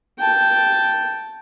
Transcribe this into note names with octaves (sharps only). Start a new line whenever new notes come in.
G5 A5